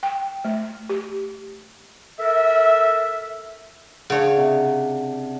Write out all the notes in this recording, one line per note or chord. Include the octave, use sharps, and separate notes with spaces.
G5
A3
G4
A4 A#4 E5
C#3 D4 C#5 F#5
C3 F#5